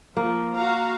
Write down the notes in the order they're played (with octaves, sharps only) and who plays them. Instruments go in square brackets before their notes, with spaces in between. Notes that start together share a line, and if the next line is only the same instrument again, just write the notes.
[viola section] F3 [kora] A#3
[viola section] F#4 F5 A#5